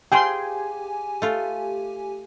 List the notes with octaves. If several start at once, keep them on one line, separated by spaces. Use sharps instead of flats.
F4 G4 G#4 C5 G5 G#5 C6
A3 F4